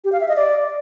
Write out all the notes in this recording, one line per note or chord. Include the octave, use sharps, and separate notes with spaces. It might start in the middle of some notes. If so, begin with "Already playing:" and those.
G4
F5
E5
D#5
D5